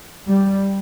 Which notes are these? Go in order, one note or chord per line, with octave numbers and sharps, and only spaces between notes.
G3